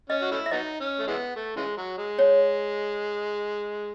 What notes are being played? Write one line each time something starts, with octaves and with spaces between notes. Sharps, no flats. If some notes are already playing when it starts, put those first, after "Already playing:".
C#4 D#5
F#4
A3 C#4 E4
E5
F#3 B3 D#4 D#5
C#4
A3
E3 G#3 B3
A3
C#3 E3 G#3
F#3
G#3
C#5